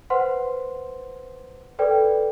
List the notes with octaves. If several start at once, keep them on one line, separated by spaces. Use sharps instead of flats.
B4 C5 F#5 C6
A4 B4 D5 G5